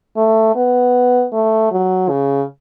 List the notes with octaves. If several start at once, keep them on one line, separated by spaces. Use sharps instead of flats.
A3
B3
A3
F#3
C#3